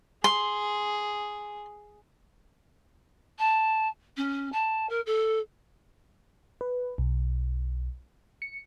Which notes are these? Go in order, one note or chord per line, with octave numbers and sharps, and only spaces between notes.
G#4 C6
A5
C#4
A5
A#4
A4
B4
B1
C#7